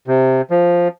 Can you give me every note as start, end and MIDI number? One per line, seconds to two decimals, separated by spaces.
0.07 0.41 48
0.50 0.88 53